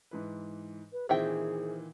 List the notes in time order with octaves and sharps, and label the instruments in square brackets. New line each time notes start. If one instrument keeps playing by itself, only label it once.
[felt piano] G#2 E3 B4
[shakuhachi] B4
[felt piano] A#2 D#3 E3 [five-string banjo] C4 E5 G5 [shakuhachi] G#4